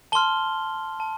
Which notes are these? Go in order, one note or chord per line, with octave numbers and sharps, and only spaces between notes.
A5 C6 F6 G7
A5